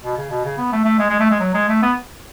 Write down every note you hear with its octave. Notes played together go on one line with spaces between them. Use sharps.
B2
C#3
B2
C#3
B3
A3
A3
G#3
G#3
A3
G#3
F#3
G#3
A3
B3